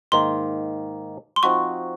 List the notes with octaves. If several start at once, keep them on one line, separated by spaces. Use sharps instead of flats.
G#2 D#3 A#3 C6
C6
F3 C4 D#4 F#4 C#6